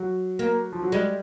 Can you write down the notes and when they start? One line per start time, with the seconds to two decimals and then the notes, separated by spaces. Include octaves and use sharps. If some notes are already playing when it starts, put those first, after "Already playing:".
Already playing: F#3
0.39 A#3
0.72 F3
0.83 F#3
0.92 G3 G#3